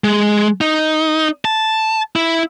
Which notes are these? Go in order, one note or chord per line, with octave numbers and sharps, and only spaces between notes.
G#3
D#4
A5
E4